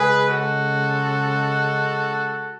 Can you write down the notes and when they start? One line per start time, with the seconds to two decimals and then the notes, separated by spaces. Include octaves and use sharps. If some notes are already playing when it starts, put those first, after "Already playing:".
Already playing: C#3 G#3 G#4 B4
0.28 F#4 A4